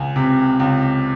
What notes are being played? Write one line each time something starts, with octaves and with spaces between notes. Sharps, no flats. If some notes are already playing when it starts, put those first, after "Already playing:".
Already playing: C#2 G#5
C3
C#2